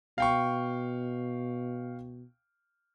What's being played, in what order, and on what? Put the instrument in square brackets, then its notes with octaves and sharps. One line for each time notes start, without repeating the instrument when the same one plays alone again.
[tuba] B2 [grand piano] F5 G5 C#6